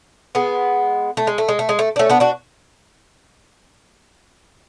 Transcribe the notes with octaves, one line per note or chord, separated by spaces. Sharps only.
G#3 B3
A3
G#3
A3
G#3
A3
G#3
A3
D4
A3 C#4
B3 D4
D4 F#4